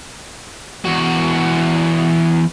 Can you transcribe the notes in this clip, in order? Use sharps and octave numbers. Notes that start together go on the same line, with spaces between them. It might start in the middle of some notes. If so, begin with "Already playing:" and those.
E2 F#4